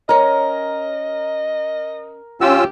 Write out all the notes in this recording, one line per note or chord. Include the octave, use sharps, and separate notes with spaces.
C#4 A#4 C#5 D#5
D2 C#4 F4 G4 E6